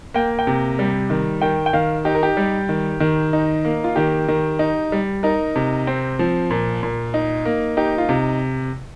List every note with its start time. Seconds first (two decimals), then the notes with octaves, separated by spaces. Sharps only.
0.14 A#3 G5
0.39 G5
0.47 C3
0.79 G3
1.10 D#3
1.41 D#3 G5
1.66 G5
1.73 D#3 F5
2.05 D#4 G4
2.15 A#4
2.23 G4
2.37 G3
2.69 D#3
3.00 D#3
3.33 D#4
3.65 A#3
3.84 F4
3.96 D#3 G4
4.28 D#3
4.59 D#4
4.92 G3
5.23 D#4 A#4
5.56 C3
5.87 C4
6.19 F3
6.51 A#2
6.83 A#2
7.14 D#4
7.45 A#3
7.77 D#4 G4
7.98 F4
8.09 C3